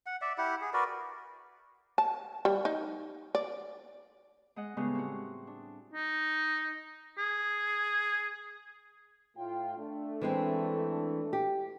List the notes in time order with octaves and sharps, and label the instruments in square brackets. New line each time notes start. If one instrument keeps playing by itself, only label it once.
[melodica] F#5
D5 E5
E4 G4 F#5
G#4
F#4 A#4 B4 D5
[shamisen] A5
G3
D#4
D5
[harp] G#3 D#5 F#5
A2 C#3 G3 G#3 B3
C4 F#4
D4
[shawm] D#4
G#4
[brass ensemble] A2 F4 G5
A3 D4
[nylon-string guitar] E3 G#3 C4
G4